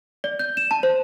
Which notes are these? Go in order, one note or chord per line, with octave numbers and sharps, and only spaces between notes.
D5
G6
E7
A5
C5